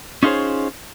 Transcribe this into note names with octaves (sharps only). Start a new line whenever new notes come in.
C#4 D#4 F4 G#4 C5 C#5